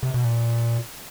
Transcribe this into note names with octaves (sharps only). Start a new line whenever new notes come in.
C3
B2
A#2